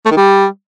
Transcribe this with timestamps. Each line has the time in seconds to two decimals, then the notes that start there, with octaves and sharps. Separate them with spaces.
0.06 A3
0.11 D#3
0.17 G3